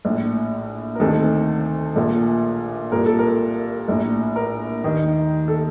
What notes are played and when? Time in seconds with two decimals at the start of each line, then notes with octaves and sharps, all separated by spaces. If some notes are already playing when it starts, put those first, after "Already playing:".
0.05 A#1 A2
0.95 A#4
1.00 D2 C3 D#3 A4
1.96 A#1 A#2
2.92 C2 A#2 A#4
3.06 A4
3.19 A#4
3.88 A#1 A2
4.36 A#4
4.84 D#2 D#3
5.48 A4